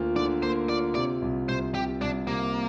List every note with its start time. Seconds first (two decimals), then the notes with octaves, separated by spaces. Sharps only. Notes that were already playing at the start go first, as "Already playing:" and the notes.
Already playing: D2 A#3 F4
0.16 D3 D5
0.42 A#3 C5
0.69 F4 D5
0.95 C3 D5
1.22 C2
1.48 C2 C5
1.75 C3 G4
2.01 C2 D4
2.27 C3 A#3